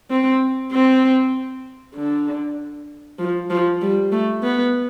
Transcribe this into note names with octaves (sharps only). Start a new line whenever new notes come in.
C4
C4
D3
F3
F3
G3
A3
B3